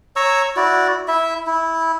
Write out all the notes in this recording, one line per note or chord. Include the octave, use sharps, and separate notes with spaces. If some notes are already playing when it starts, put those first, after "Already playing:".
C#5 A#5 C#6 E6
E4 F#4 D5
E4 E5
E4